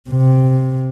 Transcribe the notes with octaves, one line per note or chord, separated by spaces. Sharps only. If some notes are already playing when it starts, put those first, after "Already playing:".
C3